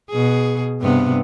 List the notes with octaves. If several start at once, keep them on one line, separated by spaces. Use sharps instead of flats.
B2 G#4
G2 C3 B3